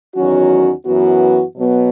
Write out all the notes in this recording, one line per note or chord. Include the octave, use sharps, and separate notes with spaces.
E2 D#3 F#3 C#4 F#4
F#2 E3 B3 F#4
B2 F#3 B3